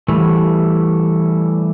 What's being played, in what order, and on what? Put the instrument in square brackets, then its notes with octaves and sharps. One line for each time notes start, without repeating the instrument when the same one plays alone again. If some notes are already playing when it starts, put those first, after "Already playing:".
[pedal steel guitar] E3 G3 A3